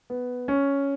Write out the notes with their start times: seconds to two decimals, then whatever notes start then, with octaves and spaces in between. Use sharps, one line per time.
0.10 B3
0.48 C#4